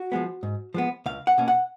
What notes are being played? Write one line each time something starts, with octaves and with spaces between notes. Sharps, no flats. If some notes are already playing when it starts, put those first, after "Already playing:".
Already playing: F#4
F3 G#3 B3
G#2
F3 G#3 B3
C#2 F5
F#5
B2 A#3 C#4
F#5